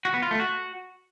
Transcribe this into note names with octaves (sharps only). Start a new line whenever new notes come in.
F#4
B3
F4
A3
F#4